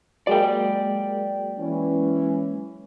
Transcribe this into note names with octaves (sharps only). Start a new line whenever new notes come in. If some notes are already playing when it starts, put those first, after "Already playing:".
F#3 G#3 A#3 D5 G5
E3 C#4